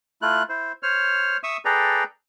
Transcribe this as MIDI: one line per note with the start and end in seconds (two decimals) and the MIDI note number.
0.22 0.43 57
0.22 0.43 64
0.22 0.43 65
0.22 0.43 90
0.49 0.72 64
0.49 0.72 72
0.83 1.37 72
0.83 1.37 73
0.83 1.37 89
1.43 1.57 76
1.43 1.57 85
1.43 1.57 87
1.43 1.57 88
1.65 2.04 68
1.65 2.04 69
1.65 2.04 71
1.65 2.04 74
1.65 2.04 79
1.65 2.04 82